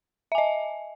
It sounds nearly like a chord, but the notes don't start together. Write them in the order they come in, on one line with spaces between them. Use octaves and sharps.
E5 G#5 D#5